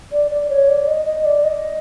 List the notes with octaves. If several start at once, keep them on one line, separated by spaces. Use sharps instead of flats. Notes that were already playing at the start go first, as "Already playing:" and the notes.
D5
D5
C#5
D5
D#5
D#5
D5
D#5